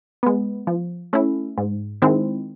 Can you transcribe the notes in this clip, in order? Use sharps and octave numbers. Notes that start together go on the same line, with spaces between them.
G#3 B3
F3
A3 C#4 E4
G#2
D#3 G#3 C4 E4